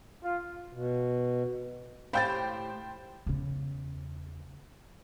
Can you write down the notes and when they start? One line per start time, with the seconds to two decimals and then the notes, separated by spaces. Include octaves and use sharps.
0.23 F4
0.73 B2
2.13 A2 G4 C5 F5 G5 B5 G6 A6
3.26 E2 C#3